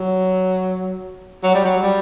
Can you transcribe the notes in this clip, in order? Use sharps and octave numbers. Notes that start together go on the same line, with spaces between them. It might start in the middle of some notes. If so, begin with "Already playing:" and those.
Already playing: F#3
F#3
G3
F#3
G3